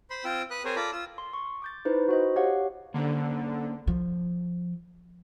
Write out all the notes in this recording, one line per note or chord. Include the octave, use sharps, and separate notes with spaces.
C5 B5 C6
C4 F4 G5 E6
B4 D#6 F#6
C4 G#4 A#4 C5 C#5
F4 A4 D5 A#5 B5
F4 E6
C6
C#6
D6 G6 A6
D#4 E4 B4 C5
F#4 C5 D#5
G4 C#5 F5 F#5
D3 A#3 C#4 C5
F3